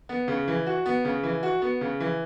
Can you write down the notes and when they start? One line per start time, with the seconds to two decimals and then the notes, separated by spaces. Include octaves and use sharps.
0.09 B3
0.28 C#3
0.48 E3
0.67 F#4
0.86 B3
1.05 C#3
1.23 E3
1.43 F#4
1.62 B3
1.81 C#3
2.00 E3